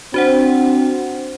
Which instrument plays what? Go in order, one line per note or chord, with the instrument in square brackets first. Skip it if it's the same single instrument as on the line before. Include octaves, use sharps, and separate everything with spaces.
[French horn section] C4 D4 [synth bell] F#4 C5 F#5